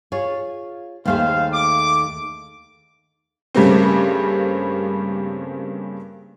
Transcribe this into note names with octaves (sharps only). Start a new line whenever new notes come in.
F4 G#4 C#5
D#2 A3 G#4 C5 F5
D6
G2 C#3 G3 A3 A#3 C4